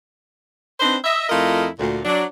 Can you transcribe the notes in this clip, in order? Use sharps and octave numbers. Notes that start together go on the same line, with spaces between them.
C4 D4 D#4 B4 C5
D#5 E5
F2 A3 E4 F4 A#4 D#5
D2 A#2
F#3 D4